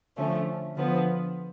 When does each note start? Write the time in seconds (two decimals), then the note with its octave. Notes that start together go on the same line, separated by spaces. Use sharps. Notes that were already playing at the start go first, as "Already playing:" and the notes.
0.16 D3 F3 A3 C#4
0.76 D3 F3 B3